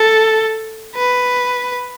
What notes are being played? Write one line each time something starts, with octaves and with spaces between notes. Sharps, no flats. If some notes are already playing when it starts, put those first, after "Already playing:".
Already playing: A4
B4